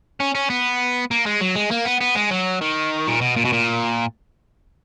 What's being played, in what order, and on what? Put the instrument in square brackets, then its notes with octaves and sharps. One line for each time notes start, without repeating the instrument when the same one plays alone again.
[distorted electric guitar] C#4
C#4
B3
A#3
G#3
F#3
G#3
A#3
B3
B3
G#3
F#3
D#3
A#2
B2
A#2
B2
A#2